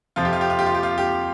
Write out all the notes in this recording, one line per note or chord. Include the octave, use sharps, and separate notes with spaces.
F2 C3 F3 F4
G4
F4
G4
F4
G4
F4
G4
F4
G4